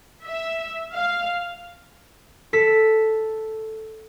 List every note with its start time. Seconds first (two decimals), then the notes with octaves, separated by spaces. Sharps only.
0.23 E5
0.94 F5
2.53 A4 B6